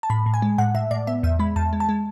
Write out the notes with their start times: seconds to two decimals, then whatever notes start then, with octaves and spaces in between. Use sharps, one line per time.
0.03 A5
0.10 A2 B5
0.26 A2
0.34 G#5
0.42 G#3
0.58 A2 F#5
0.75 A2 E5
0.91 A2 D5
1.07 B3 E5
1.23 E2 E5
1.39 G#3 B5
1.56 E2 A5
1.73 G#3
1.80 A5
1.89 G#3